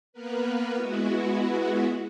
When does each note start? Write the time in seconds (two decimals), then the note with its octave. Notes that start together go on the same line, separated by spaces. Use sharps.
0.13 A#3 B3 A#4 B4
0.75 G#3 B3 E4 F#4